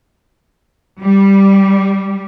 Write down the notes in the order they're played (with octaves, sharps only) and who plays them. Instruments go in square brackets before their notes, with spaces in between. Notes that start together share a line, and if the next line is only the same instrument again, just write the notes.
[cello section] G3